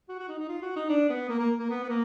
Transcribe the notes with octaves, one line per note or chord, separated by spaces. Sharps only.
F#4
F#4
D#4
D#4
F4
F#4
D#4
D4
B3
A#3
A#3
A#3
B3
B3
A#3